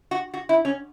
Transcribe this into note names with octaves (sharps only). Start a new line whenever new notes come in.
F#4
F#4
E4
C#4